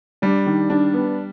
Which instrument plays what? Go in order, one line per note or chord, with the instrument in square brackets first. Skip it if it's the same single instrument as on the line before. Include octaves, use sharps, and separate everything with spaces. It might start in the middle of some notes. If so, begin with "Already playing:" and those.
[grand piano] G3 [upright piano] D4
[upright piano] D#3
D4
B3